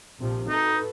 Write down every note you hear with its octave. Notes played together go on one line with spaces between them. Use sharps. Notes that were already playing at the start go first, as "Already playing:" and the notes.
A#1 C3 F3
D#4 F#4 A4 B4